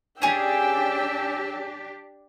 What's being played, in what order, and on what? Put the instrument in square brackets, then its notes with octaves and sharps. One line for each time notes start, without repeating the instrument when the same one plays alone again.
[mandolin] C#4 G#4 [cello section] D4 G4 [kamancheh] G5 E6